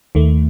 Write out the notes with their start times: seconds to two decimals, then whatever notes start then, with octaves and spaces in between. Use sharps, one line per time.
0.15 D#2 D#3 A3